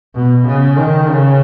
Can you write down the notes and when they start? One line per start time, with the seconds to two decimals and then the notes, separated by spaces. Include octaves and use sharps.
0.15 B2
0.47 C#3
0.77 D#3
1.09 C#3